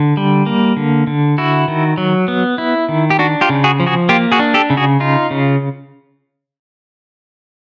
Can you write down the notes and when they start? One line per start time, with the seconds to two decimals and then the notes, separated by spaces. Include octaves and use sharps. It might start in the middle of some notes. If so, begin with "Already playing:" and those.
Already playing: D3
0.17 G3
0.46 A#3
0.77 D3
1.07 D3
1.38 E4 F#4
1.68 D#3
1.97 F#3
2.28 B3
2.58 E4
2.89 D#3
3.10 G4
3.19 D4 F#4
3.41 F4 G4
3.49 C#3
3.64 F#4 G#4
3.80 F3
3.87 F#4 G#4
4.09 A#3 F4 G4
4.32 F#4 G#4
4.39 D4
4.54 G4 A4
4.70 C#3
4.77 F#4 G#4
5.00 D#4 F4
5.31 C#3